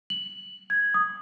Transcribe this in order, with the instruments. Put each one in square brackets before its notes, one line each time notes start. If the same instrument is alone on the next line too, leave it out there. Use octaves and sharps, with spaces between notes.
[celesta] F#7
G#6
D#6